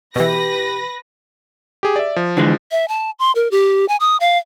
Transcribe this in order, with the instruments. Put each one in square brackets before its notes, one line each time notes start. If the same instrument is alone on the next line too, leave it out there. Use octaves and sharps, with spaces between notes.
[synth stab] B2 E3 [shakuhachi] G4 [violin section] B4 A#6
[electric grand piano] G4 G#4
D5 E5
F3
[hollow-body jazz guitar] D3 E3 G#3
[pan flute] E5
A5
C6
A#4
G4
G#5
D#6
F5